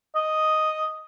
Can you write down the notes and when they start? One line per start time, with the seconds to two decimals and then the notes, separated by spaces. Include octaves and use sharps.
0.15 D#5